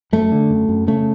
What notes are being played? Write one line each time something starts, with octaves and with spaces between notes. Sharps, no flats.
F#2 A3
D3
F#2
F#2
C#3 A3